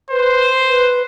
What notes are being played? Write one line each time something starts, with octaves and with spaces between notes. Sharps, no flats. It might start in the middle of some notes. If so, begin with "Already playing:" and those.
B4 C5
B4